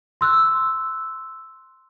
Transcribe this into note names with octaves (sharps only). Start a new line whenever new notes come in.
C6 E6 F#6